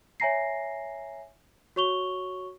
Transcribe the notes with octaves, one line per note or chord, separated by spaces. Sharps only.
C#5 E5 G#5 A#5 A#6 C7
F#4 C#5 C#6 F7 G7